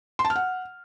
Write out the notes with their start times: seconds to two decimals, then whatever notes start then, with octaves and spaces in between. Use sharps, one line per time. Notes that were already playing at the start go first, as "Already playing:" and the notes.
0.19 C6
0.25 A5
0.30 F6
0.36 F#5